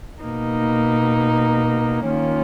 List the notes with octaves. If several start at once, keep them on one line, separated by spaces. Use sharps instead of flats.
B2 A#3 D#4
D#3 A#3 C#4 F4